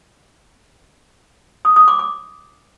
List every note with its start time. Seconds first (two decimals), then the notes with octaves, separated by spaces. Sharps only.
1.65 D#6
1.76 D#6
1.88 D6
1.99 D6